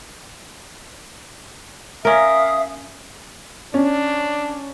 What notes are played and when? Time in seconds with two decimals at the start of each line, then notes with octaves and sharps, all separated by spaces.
2.05 C#4 A#4 E5 F5 D#6
3.74 C#4 D4